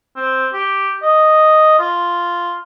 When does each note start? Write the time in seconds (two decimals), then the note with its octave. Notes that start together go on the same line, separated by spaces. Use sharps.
0.16 C4
0.53 G4
1.02 D#5
1.79 F4